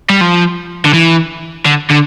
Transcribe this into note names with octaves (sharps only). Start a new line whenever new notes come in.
G3
F3
D3
E3
D3
D3